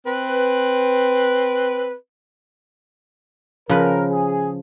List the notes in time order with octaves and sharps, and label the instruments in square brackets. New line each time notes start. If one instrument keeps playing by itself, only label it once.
[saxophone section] C4 B4
[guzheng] C#3 B4 [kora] F3 [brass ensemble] A#4
[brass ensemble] G#4